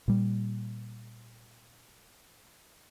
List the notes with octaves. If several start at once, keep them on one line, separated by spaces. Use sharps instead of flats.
A#2 G3